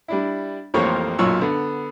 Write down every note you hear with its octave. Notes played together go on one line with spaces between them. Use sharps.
G3 D4 E4
A1 F2 F3 G3 A#3 C#5
B1 F#2 A#2 C#5 E6
D3 B3